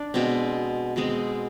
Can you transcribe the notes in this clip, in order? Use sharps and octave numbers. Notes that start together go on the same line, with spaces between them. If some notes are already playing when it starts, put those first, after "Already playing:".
Already playing: D4
B2 G#3 C4
B2 G#3 C4